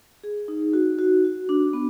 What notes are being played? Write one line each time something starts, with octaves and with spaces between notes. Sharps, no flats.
G#4
D#4
F#4
F#4
F#4
D4
B3